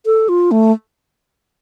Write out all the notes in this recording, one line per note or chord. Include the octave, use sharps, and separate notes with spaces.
A4
F4
A3